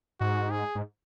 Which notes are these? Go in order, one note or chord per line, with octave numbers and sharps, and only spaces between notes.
G#2 F#4
G#4
G#2